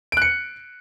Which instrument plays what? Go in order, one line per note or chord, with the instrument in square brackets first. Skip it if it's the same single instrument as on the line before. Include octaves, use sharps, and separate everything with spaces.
[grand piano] D7
F#6
C#7